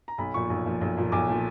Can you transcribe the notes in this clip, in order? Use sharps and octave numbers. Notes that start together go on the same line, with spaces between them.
A#5
B1 B5
A#2 F3 C#6
B1
A#2 F3
B1
A#2 F3
B1 D6
A#2 F3